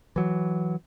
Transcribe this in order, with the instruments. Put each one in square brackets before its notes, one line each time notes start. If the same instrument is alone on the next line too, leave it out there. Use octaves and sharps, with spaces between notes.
[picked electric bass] E3 F#3